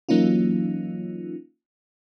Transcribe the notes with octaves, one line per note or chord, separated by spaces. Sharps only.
E3 F#3 A#3 C#4 D#4 F4